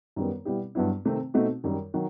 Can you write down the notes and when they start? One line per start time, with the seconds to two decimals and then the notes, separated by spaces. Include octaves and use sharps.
0.16 F#2 D#3 G3 B3
0.45 B2 G3 B3 E4 G4
0.75 G2 F#3 B3 E4
1.05 C3 D#3 A3 C4
1.34 B2 A3 C4 D#4 F#4
1.64 F#2 D#3 G3
1.94 D#3 F#3